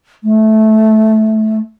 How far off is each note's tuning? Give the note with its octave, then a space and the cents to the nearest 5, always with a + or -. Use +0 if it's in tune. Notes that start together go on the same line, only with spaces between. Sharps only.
A3 -15